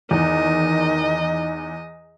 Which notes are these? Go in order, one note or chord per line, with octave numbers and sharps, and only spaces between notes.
E2 D#3 D#4 D#5